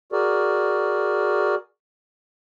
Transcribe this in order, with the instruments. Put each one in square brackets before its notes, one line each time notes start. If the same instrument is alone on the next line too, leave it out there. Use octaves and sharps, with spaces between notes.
[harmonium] F#4 G#4 A#4 D5